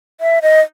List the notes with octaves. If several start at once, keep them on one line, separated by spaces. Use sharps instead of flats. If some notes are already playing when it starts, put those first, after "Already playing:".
E5
D#5